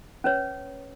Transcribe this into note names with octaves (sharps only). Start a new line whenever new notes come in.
C#4 B4 C#5